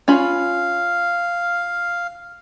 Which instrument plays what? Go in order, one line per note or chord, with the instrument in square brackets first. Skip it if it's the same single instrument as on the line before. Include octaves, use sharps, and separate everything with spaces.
[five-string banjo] C#4 F4 B5 [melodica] F5